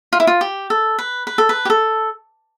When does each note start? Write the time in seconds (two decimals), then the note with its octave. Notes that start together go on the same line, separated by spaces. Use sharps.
0.13 F4
0.20 E4
0.27 F4
0.41 G4
0.70 A4
0.99 B4
1.27 B4
1.38 A4
1.49 B4
1.65 G4
1.70 A4